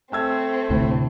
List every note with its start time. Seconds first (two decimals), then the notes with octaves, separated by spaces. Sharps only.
0.12 A3 C4 G5 E6 G#6
0.70 D2 A2 C3